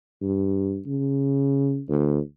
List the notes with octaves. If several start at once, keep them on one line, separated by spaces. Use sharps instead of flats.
G2
C#3
D2